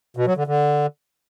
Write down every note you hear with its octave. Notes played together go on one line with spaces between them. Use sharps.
B2
F#3
D3
D3